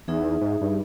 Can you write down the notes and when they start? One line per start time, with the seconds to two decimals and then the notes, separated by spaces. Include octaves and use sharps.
0.08 E2 D#4 G#4 E5
0.41 G#2
0.61 G2